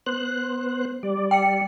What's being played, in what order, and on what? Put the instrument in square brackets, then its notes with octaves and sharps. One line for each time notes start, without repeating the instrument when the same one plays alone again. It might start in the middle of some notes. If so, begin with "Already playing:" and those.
[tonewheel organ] B3 C5 F#6
G3 D5
[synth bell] G5 C#7